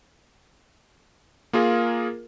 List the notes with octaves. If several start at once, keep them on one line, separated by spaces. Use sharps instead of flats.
A#3 F4 G#4 A#4 F5